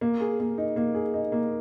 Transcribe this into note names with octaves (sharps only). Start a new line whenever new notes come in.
A#3
G#4
A#3
D#4
A#3
G#4
D#4
A#3